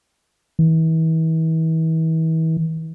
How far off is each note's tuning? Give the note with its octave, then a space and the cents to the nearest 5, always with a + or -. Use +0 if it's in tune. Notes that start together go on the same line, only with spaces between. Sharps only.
E3 -40